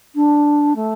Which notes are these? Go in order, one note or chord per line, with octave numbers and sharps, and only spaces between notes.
D4
A3